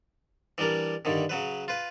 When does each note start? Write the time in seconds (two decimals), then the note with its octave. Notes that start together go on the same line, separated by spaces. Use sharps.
0.58 E3 G3 D4 A#4
1.05 G2 D3 D#3
1.29 C#3 F#3 B4
1.68 F4 B4